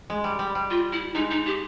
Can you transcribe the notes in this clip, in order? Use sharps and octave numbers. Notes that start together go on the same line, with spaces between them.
G#3
G3
G3
G3
F4
E4
G#3 D#4
D#4
G4